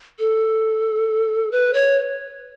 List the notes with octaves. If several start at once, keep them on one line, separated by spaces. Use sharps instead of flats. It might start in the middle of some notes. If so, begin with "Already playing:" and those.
A4
B4
C#5